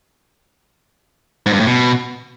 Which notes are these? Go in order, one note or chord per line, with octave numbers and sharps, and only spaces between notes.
G#2
G2
A2
B2